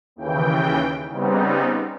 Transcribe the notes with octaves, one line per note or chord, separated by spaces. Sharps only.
D#2 C#3 E3 G5
C#3 G3 B3 C4 D#4